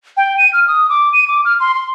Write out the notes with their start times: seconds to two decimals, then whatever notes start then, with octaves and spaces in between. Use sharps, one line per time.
0.17 G5
0.38 D#7
0.53 F6
0.68 D#6
0.89 D6
1.13 D#7
1.28 D6
1.45 F6
1.60 C6
1.75 C6